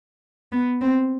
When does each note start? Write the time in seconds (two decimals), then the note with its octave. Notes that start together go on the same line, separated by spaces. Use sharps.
0.52 B3
0.81 C4